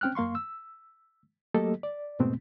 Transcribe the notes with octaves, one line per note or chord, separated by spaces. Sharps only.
C4 C#4 G5 F6 F#6
F#2 A#3 F5 C6 C#6
E6
F#3 A3 A#3 G4 A4 D#5
D5
E2 G#2 B2 A3 B3 C4